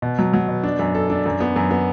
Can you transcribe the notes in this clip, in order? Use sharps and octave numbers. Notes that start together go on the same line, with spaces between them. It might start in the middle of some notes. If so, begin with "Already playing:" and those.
B2
F#3
F#3
B2
D4
F#2
A4
D4
F#2
B3
F#2
B3